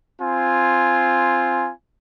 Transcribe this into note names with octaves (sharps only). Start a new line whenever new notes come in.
C4 F4 G#5